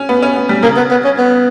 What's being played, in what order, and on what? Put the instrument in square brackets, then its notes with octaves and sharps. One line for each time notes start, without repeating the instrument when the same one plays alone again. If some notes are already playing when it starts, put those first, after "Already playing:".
Already playing: [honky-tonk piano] C#4
B3
C#4
B3
G3
[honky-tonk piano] C#3 [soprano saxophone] A#3
[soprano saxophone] B3
B3
C#4
B3